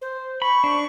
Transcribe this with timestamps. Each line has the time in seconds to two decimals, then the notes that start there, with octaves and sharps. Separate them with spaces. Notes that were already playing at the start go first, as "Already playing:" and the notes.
0.01 C5
0.42 B5 C#6
0.64 D4